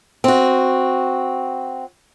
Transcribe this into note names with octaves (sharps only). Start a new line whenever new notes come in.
C4 F#4